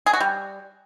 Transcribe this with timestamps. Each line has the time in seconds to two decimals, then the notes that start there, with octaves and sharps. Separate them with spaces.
0.06 G#4
0.13 F#4
0.20 G3